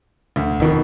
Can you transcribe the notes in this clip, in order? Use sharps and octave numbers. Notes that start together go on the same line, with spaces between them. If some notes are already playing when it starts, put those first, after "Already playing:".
D2
E1 F2 B2 D#3